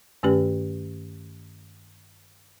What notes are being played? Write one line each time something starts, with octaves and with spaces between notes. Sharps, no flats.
G2 D#3 A3 C#4 G4 B4